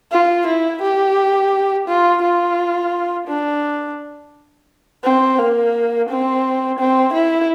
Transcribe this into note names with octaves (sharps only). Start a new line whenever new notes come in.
F4
E4
G4
F4
F4
D4
C4
A#3
C4
C4
E4